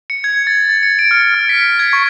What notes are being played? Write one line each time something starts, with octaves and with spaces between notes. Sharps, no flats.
C#7
G#6
A6
A6
C#7
D7
F6
F6
B6
G#6
C#6